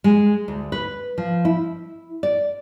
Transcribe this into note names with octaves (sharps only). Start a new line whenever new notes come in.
G#3
D2
B4
F3
E4
D5